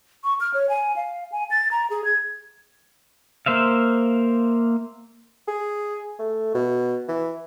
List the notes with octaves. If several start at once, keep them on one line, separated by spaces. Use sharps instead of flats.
C#6
F6
C#5
G#5
F5
G#5
A6
A#5
G#4
G#6
A#3 C5 E5 F5
G#4
A3
B2
E3